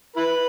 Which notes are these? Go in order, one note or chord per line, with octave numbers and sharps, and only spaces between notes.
E4 B4